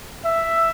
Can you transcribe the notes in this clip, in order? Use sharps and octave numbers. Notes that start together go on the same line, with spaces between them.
E5